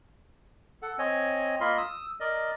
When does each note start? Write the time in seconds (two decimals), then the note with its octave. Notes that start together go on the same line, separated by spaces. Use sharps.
0.82 A4 F#5
0.99 C4 C#5 D#5 G#5
1.61 A#3 F4 A#4 D#5 B5 C6
1.78 D#6 E6
2.20 A#4 D5 D#5